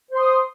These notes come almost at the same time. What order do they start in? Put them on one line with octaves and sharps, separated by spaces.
C5 C6 D#6